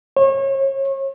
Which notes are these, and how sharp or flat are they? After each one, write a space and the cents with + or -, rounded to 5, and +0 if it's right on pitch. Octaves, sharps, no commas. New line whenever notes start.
C#5 -35